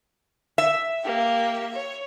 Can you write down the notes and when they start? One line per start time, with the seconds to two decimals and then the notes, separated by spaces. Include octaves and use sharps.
0.58 E5
1.04 A#3 G4
1.74 C#5